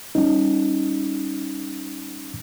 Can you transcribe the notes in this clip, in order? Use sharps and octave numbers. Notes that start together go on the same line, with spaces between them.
G3 C#4 D#4